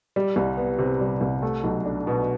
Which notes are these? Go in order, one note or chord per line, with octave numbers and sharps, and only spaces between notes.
G3
C2
B3
C3
G3
C2
A3
B1
D4
B2